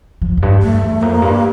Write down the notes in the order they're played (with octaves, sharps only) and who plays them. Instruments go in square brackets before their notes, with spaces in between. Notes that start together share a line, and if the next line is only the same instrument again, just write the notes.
[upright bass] F3
F2
G2
[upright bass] G2 [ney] A3
[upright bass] E2
[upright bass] F2 [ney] A#3
[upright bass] G2